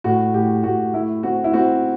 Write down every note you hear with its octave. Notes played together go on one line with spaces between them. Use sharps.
A2 F#4
A2 G4
A2 F#4
A3 E4
C4 F#4
E4
C4 F#4